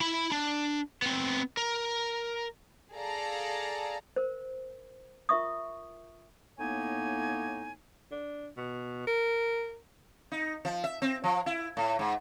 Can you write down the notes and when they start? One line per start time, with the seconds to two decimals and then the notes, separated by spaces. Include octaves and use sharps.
0.01 E4 B5
0.32 D4
1.02 B3 C4
1.57 A#4
2.93 G#4 A4 D5 F5 A5 A#5
4.16 A#4 C5
5.29 F4 A#4 E5 C#6 D#6
6.59 A2 A#3 B3 D#4 C#5 G#5
8.11 D4
8.57 B2
9.07 A#4
10.32 D#4
10.65 F3
10.84 E5
11.02 C4
11.24 F3
11.46 E4
11.77 A2
11.99 G#2